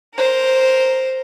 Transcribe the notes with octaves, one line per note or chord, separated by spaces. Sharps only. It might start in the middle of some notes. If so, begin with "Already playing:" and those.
A#4 C5